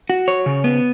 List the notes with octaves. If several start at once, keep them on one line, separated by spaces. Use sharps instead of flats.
F#4
C#5
C#3
B3